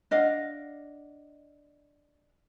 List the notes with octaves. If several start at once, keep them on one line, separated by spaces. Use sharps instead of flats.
D4 D#5 F5 F#5